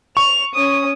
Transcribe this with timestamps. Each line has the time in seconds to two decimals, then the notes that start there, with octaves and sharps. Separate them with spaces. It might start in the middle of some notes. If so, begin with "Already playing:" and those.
0.17 C#6 F7
0.55 C#4 D#6